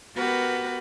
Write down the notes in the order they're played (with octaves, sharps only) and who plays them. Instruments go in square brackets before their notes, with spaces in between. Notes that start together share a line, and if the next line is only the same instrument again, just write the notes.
[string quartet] B3 F#4 G4 A#4 B4 F#5